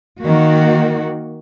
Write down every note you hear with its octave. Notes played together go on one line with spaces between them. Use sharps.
D#3 A#3 F#4